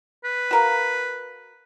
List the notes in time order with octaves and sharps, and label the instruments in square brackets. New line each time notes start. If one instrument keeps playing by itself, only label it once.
[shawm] B4
[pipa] F#4 A#4 F5